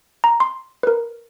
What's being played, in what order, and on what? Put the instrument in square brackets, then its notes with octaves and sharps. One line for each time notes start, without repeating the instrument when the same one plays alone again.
[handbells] A#5
C6
A#4 B4